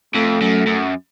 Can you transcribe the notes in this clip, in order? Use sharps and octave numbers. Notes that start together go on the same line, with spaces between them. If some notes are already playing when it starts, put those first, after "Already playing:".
F2 A3
F#2
F#2